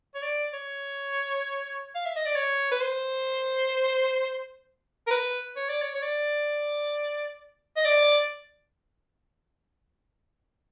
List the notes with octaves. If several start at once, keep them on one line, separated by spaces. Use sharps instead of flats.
C#5
D5
C#5
F5
E5
D#5
D5
C#5
B4
C5
A#4
B4
C#5
D5
C#5
C#5
D5
D#5
D5